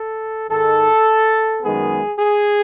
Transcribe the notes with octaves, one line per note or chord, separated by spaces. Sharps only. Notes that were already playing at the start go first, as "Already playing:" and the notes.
Already playing: A4
G#2 D#3 G#3 A4
F#2 D#3 G#3 B3 G#4
G#4